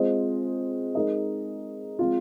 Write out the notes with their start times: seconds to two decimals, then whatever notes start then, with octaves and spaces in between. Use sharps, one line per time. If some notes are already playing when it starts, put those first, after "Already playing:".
Already playing: G#3 C4 F4 C5 D#5
0.95 G#3 D#4 A#4 D#5
1.99 G#3 C4 F4